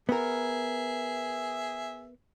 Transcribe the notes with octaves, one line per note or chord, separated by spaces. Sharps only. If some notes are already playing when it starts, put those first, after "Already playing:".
B3 G#4 A#4 E5